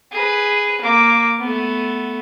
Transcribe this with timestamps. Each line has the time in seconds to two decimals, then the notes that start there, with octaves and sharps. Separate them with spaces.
0.12 G#4 B4
0.81 A#3 D6
1.40 A3 B3